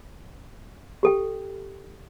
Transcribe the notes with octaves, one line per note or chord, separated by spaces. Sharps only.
G4 A4 G5